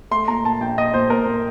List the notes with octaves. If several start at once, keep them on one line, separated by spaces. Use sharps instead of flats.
A3 C6
A#2 A#5
A#2 A5
A#1 G5
A#1 D#5
A#2 C5
A#2 A#4
A#2